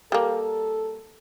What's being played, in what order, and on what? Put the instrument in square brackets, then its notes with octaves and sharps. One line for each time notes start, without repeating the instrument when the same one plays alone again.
[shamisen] G3 A#3 [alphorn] A4